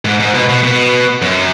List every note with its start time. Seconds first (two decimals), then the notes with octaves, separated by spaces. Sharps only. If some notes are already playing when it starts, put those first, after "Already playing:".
0.05 G#2
0.20 G#2
0.34 B2
0.49 B2
0.63 B2
1.22 F#2